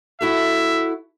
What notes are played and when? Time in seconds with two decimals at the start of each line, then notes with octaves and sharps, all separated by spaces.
0.21 E4 F#4 A4 E5